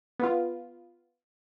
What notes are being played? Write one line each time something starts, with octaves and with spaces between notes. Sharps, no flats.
B3 F4